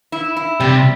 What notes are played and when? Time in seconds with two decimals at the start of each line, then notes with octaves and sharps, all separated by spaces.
0.12 E4
0.37 E4
0.60 C3 G3